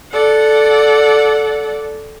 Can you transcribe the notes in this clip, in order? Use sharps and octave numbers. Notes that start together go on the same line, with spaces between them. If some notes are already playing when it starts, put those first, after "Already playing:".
A4 D5 F#5